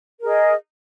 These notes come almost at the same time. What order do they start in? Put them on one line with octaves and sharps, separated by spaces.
A#4 G#4 D#5